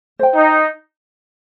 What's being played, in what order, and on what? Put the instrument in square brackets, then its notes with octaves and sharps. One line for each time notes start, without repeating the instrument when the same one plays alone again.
[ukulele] C5 G5
[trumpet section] D#4